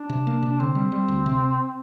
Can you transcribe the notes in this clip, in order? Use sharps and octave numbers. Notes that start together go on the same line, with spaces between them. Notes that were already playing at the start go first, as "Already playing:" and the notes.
Already playing: D4
C3
A#3
C3
D4
D3 C4
G3
G3
D2
C3